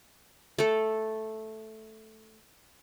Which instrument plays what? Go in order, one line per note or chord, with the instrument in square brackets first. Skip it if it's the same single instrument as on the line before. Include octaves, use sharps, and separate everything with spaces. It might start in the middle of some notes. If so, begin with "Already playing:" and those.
[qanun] A3 A4